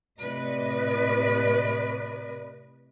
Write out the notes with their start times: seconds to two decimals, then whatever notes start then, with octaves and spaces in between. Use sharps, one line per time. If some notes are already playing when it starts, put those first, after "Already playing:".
0.19 A2 C3 B4 D5 D#5